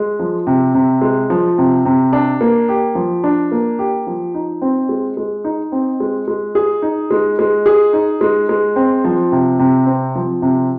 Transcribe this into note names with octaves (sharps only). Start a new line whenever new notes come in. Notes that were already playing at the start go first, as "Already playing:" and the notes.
Already playing: G#3
F3
C3
C3
G#3
F3
C3
C3
D4
A#3
G4
F3
D4
A#3
G4
F3
D#4
C4
G#3
G#3
D#4
C4
G#3
G#3
G#4
D#4
G#3
G#3
G#4
D#4
G#3
G#3
C4
F3
C3
C3
C4
F3
C3